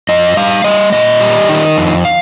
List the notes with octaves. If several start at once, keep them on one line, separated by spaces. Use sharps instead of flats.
F2 D#5
G3 F5
G3 D#5
A#2 D#5
G3
D#3
F2
F5